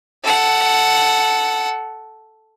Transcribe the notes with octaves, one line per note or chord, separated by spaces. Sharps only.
A4 F#5